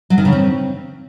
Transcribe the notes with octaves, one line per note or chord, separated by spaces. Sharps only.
F#3
D#3
C#3
C4